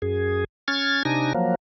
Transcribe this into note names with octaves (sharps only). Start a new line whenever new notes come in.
F#2 G#4
C#4 F6 G#6 A6
C3 D4 D#4 G#5 A#6
F3 F#3 A#3